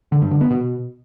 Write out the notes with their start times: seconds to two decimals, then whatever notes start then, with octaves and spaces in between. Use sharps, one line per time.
0.12 D3
0.22 G2
0.31 D3
0.41 B3
0.50 B2